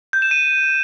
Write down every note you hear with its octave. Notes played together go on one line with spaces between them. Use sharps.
G6
E7
D#7